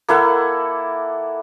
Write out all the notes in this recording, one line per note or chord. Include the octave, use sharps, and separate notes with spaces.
A#3 E4 A4 F#5